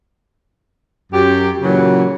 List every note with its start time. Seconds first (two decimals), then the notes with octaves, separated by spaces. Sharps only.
1.13 F#2 G4
1.62 A#2 C#3 E3 F#3